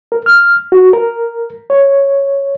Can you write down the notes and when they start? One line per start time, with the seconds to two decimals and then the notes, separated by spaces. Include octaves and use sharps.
0.12 A#4
0.26 F6
0.72 F#4
0.93 A#4
1.70 C#5